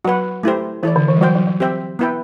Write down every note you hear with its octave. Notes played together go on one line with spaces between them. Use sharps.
F#3 F#4 B4 F#5
A3 E4 G4 C5
E3 E4 A4 D5
D3
E3
G3
F#3 F#4 C5 G5
F#3
F#3
C4 G4 C5 E5 G5
B3 E4 B4 E5 G5